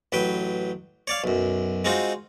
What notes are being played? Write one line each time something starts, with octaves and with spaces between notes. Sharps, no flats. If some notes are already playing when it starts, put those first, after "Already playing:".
A1 F#3 B4 G5
C#5 D5 F5
B1 F#2
G#3 C4 D#4 F4 F#4